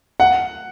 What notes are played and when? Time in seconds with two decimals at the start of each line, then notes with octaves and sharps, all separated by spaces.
0.20 F#5